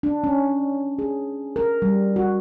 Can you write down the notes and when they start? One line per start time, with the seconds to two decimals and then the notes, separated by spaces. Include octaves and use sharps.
0.03 D4
0.24 C#4
0.99 G#4
1.56 A#4
1.82 G3
2.16 F#4